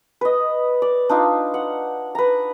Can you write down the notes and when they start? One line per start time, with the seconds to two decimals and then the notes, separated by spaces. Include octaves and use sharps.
0.21 B4 D#5
0.82 D5
1.09 D4 D#4 F4
1.54 F#5
2.15 B4 A#5